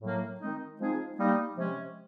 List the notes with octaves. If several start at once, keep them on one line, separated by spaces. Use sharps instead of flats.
A2 F#3 A#3
D#3 G#3 C4 D#4
F3 G#3 C4 D#4 G#4
G3 A#3 D#4
C3 F3 G#3 C#4